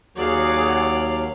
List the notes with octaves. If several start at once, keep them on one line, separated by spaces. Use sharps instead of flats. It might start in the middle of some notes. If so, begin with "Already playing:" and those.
D#2 F#3 F#4 G#4 D5 F5